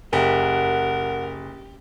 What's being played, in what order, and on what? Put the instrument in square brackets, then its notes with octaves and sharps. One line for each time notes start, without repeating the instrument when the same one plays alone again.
[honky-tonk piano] F#1 [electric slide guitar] G4 [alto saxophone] A#4 [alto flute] F#5